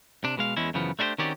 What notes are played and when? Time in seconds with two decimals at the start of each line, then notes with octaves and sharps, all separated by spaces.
0.24 C3 D4
0.37 B2 G#3 F5
0.57 E2 G#3 C#4 E4
0.74 F#2 C#3 E3 F3 B3
0.99 A3 D4 E4 G4 C5
1.18 D#3 C4 C#4 F#4 G4 D5